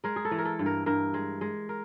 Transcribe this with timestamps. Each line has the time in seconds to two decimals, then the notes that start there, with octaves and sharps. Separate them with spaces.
0.04 G#3 A#4
0.16 G#4
0.25 A4
0.31 E3
0.38 A#4
0.45 A4
0.59 G2
0.66 A#4
0.86 G2 A#4
1.14 G#3
1.41 G#3
1.69 A#4